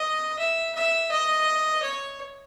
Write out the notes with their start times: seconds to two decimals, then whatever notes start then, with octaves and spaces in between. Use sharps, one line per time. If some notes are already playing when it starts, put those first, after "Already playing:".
Already playing: D#5
0.39 E5
0.75 E5
1.11 D#5
1.82 C#5